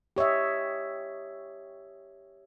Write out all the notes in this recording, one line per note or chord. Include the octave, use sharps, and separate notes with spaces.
G4 C#5 D#5 E5